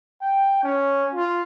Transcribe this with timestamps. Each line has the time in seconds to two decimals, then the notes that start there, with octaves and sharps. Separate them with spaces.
0.21 G5
0.63 C#4
1.14 F4